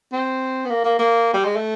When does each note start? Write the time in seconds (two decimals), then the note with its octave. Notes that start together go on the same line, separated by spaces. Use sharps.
0.13 C4
0.65 B3
0.70 A#3
0.84 A#3
0.99 A#3
1.34 G3
1.45 G#3
1.56 A3